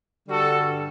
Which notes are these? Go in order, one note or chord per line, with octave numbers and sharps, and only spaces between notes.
G2 D3 G3 F#4 A4